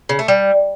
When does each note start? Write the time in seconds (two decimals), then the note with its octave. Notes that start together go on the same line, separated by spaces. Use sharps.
0.09 C#3
0.19 A3
0.28 G3